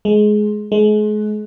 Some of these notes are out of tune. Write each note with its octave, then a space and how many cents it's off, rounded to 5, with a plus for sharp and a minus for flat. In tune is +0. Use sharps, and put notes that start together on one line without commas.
G#3 +20
G#3 +35